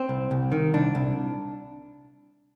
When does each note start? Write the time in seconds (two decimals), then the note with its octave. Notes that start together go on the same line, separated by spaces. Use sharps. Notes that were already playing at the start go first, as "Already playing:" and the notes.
Already playing: C4
0.09 C2
0.31 C2
0.52 D#3
0.74 C2 D4
0.95 C2